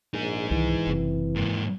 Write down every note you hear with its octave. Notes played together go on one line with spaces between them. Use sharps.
A#1 D#4 G#4
C2 D#3 E3
F#1 C3
G#2 A#3